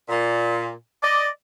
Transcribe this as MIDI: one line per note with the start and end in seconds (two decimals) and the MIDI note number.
0.09 0.71 46
1.03 1.26 74
1.03 1.26 75